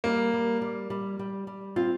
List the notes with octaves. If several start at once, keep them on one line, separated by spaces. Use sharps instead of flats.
G3 A#3
G3
G3
G3
G3
G3
C4 F4